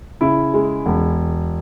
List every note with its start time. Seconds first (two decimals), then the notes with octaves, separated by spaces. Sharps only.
0.21 C#3 E4
0.54 G#3
0.86 E1